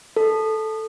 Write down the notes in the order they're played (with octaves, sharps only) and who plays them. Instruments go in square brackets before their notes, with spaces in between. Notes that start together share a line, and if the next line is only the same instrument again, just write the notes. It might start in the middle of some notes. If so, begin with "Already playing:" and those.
[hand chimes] A4